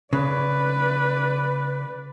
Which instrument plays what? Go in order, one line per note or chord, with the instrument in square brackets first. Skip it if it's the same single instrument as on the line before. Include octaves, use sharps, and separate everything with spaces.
[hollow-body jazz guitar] C#3 [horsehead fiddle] B4 D5